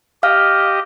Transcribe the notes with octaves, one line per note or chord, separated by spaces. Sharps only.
G4 D#5 F5 F6